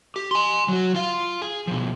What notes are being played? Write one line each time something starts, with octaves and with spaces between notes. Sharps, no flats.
G4
G#5 C6
F#3 F#4
F4 F5
G#4
B2 F3